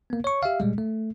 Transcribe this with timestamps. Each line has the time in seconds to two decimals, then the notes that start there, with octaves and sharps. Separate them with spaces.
0.10 A#3 B3
0.24 C#5 C#6
0.43 G4 E5 F5
0.60 A#2 G3 G#3
0.78 A3